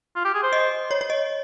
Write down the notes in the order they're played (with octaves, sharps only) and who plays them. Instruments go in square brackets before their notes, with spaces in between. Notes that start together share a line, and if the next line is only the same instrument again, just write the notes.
[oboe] F4
G4
G#4
C5
[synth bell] D#5
C#5
C#5
D#5